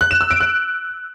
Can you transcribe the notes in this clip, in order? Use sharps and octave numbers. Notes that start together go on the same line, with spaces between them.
F#6
E7
E6
D7
F#6